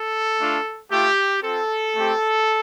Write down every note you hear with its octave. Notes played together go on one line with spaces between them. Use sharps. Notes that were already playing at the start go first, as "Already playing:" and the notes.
Already playing: A4
A3 D4 F4
A3 F4 G4
C4 F4 A4
A3 C4 G4